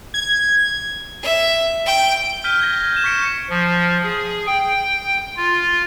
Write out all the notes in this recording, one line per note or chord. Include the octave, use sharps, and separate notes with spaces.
G#6
E5
G5
F6 G6 B6 D#7 G7
F6 G#6 A#6
G6 E7
C#6 B6 C#7 D7
F3
G#4
G5
F4